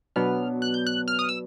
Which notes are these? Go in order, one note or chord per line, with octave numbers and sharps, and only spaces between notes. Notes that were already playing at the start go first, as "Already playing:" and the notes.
B2 F#3 B3 D4 F6
F#6
G6
F#6
F6
D#6
E6